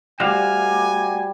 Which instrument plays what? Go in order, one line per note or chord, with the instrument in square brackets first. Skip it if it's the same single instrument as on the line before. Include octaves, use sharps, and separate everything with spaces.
[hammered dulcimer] G3 [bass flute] A3 [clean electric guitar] F#4 C5 F5 [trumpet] G#5